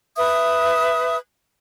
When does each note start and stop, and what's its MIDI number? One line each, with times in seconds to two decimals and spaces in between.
0.17 1.16 71
0.17 1.16 76
0.17 1.16 87